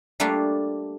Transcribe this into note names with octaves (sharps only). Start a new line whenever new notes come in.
G3 A3 A#3 D4 F4